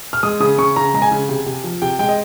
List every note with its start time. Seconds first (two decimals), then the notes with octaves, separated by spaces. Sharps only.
0.13 F6
0.23 G#3 D#6
0.40 C#3 D#6
0.59 C#3 C#6
0.76 C#3 A#5
0.94 G#3 A#5
1.02 G#5
1.11 C#3
1.29 C3
1.46 C3
1.64 F3
1.82 C3 G5
1.99 G#3 G5
2.09 D#5